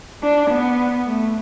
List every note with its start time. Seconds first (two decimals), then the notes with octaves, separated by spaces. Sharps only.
0.23 D4
0.51 B3
1.07 A3